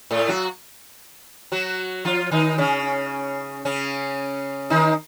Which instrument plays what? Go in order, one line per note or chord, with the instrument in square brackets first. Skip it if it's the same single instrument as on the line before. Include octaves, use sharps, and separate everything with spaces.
[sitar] A2 A3
F#3 F#4
F#3 F#4
F3 F4
D#3 D#4
C#3 C#4
C#3 C#4
D#3 D#4